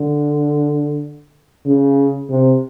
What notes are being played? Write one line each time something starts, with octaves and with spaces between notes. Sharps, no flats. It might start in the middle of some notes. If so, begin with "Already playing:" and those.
Already playing: D3
C#3
C3